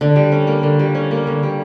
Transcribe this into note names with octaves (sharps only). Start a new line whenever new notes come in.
D3
G3
C#4
A#3
D3
G3
C#4
A#3
D3
G3